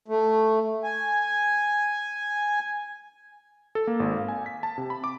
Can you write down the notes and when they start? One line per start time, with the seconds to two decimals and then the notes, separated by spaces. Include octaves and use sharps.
0.08 A3
0.84 G#5
3.75 A4
3.87 A#3
4.00 G#1
4.16 F5
4.28 G#5
4.46 B6
4.63 A5
4.78 C3
4.90 B5
5.04 D6